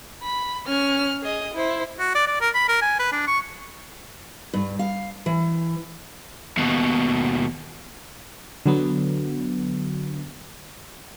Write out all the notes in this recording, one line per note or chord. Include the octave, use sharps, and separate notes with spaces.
B5
C#4 F6
G#4 D#5
E4 C5
F#4
D5
D5
A#4
B5
A#4
G#5
B4
D4
C#6
G2
F5
E3
D#2 B2
D3 F#3 B3